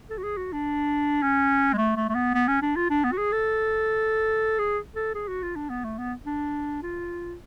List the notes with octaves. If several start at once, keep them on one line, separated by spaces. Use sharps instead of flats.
A4
F#4
G#4
F#4
D4
C#4
G#3
A3
A3
A3
B3
B3
C#4
D4
F4
D4
B3
F#4
G#4
A4
G#4
A4
G#4
F#4
F4
D4
B3
A3
B3
D4
F4